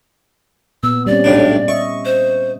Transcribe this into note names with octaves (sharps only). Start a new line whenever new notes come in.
A#2 B3 E6
G3 C4 C#4 D5
B1 A2 D4
D#5 E5 C#6
C5